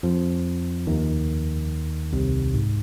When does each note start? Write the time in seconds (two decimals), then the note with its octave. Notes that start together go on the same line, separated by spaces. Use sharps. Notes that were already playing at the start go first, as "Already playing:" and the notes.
0.03 F2 F3
0.87 D#2 D#3
2.13 C2 C3
2.54 G#2